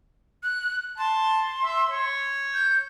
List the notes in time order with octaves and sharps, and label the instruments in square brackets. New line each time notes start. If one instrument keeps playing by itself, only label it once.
[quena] F#6
[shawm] A5 [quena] C6
[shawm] E5
C#5
[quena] G6